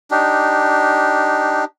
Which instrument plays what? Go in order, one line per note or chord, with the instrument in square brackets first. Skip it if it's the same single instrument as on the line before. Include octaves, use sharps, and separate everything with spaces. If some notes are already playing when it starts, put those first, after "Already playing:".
[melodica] D4 D#4 G4